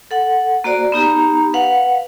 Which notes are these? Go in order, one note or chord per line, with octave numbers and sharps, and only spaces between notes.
A4 F#5
A#3 F#4 C5 D5
B3 D#4 G4 A#5
B4 F5 F#5